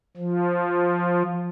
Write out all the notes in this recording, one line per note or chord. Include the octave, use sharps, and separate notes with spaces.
F3